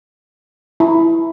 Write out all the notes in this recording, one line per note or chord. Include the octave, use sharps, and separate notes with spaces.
E4